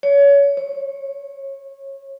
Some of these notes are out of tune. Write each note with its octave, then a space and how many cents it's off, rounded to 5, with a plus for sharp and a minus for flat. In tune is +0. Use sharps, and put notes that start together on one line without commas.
C#5 +30
C#5 -25